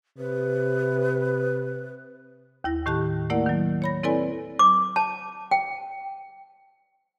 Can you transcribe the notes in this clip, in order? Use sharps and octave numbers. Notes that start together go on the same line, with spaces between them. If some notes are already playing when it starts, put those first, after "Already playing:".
C3 B4
D#2 E4 A#6
A2 D#3 G4 A5 F#6
A3 A#3 E4 A#4 D5 F#5
D#3 F#3
C#5 B5 A#6
C4 E4 A4 B4 D5 G#5
D6
A5
G5